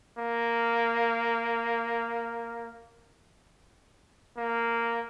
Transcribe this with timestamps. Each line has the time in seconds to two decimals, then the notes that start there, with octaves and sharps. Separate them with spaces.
0.18 A#3
4.37 A#3